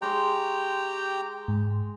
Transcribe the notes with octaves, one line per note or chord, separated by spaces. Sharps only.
G#3 G4 G5 A#5 C6 C#6
G#2